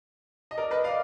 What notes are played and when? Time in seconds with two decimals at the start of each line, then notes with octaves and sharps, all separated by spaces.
0.51 D#5
0.58 A#4 D5
0.71 B4 D#5
0.84 D5 F5